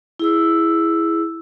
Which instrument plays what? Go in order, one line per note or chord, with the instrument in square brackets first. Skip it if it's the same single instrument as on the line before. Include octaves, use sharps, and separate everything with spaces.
[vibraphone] E4 G#4 E6